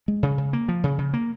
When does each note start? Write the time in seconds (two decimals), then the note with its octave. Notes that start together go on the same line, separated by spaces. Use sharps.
0.08 G#3
0.23 C#3
0.38 C#3
0.53 A#3
0.69 F3
0.84 C#3
0.98 C#3
1.14 A#3